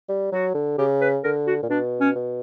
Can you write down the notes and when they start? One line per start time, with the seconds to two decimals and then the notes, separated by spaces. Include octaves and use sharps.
0.09 G3
0.32 F#3 F#4
0.54 D3
0.78 C#3 G4
1.01 B4
1.24 D3 A#4
1.47 F#4
1.63 A#2
1.69 B2 D4
2.00 C#4
2.15 B2